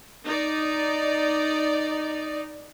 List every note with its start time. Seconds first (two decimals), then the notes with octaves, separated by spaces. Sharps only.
0.23 D#4 D5